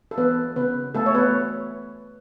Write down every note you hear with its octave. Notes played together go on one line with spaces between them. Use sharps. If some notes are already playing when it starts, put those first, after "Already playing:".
A4
E3 B3 B4
C#3 B3 B4
A3 B3 A4
C#5
B3 B4